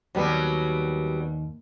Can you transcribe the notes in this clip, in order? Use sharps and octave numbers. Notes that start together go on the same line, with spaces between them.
D#2 F#3 G3 B3